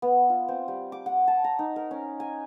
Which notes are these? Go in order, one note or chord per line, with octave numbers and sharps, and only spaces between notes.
B3
F4
C4
G3
D6
F#5
A5
A#5
D#4
A#4
C#4
G#5